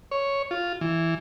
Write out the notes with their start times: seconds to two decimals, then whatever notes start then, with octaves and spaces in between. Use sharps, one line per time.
0.11 C#5
0.51 F4
0.81 E3